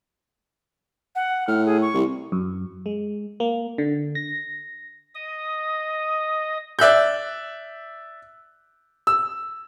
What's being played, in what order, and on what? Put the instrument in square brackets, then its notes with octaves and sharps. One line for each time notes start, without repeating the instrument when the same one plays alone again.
[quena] F#5
[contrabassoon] A2 [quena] F6
[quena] G#4
C#6
[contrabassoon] C2
[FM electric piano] F#2
G#3
A#3
D3
A#6
[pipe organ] D#5 D#6
[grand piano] D5 E5 F#6 G6
E6